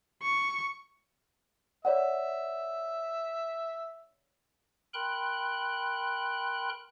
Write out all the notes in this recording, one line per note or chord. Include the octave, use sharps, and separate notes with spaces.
C#6
C#5 D5 E5 F#5
A#4 G5 B5 C6 F#6